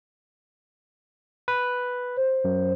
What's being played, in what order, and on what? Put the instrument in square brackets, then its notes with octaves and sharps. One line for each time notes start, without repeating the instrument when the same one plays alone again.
[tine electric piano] B4
[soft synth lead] C5
[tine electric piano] F#2